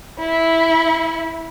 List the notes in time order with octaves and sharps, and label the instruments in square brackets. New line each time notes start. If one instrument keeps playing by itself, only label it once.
[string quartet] E4